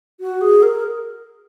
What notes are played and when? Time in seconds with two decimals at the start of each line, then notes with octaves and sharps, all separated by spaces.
0.20 F#4
0.41 G#4
0.63 A#4